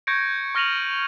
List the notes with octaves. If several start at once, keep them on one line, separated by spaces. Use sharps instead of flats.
C#6 G6 G#6 A#6 C#7 D7
C#6 F6 A#6 D#7 F7 F#7